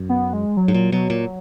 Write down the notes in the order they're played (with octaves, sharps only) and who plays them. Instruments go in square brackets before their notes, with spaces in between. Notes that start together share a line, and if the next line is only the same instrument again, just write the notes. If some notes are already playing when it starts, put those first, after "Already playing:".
Already playing: [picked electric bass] F#2
[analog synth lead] B3
G#3
F#3
[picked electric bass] G#2
A#2
[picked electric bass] B2 [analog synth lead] F#3
[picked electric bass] A#2